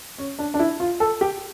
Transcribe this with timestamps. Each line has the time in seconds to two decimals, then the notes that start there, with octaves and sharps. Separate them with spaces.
0.18 C#4
0.39 D4
0.54 D4
0.59 E4
0.80 F4
1.00 A4
1.21 G4